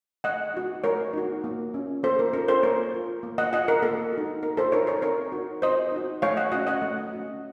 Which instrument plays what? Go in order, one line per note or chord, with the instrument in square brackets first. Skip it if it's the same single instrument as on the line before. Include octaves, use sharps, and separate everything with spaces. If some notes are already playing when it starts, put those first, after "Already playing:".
[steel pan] A3 D#5 F#5
D#4 F#4
A3 A#4 C#5
D#4 F#4
A#3
C#4 F4
A#3 A4 C5
A#4
C#4 F4 A#4
A4 C5
A#3 A#4 C#5
F4
A#3
D#5 F#5
F4 D#5 F#5
A#4
A#3 A4
F#4
D#4
A#3 A#4
A4 C5
D#4 F#4 A#4 C#5
A#4 C#5
C4 A#4 C#5
D#4 F#4
C4 C5 D#5
D#4 F#4
A3 C#5 F5
D#5 F#5
C#4 F#4 D#5 F#5
D#5 F#5
A3
C#4 F#4